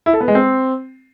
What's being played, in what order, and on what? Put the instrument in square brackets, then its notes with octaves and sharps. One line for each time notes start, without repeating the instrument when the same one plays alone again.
[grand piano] E4
A4
B3
G#3
C4